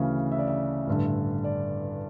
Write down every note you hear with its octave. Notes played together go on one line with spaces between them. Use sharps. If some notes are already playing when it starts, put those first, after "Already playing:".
Already playing: D2 C#3 E3 F5
E5
D5
E5
A1 G2 D3
D5